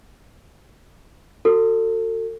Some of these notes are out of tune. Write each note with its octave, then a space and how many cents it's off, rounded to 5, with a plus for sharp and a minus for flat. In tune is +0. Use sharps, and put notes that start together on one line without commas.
F#4 +0 A4 +35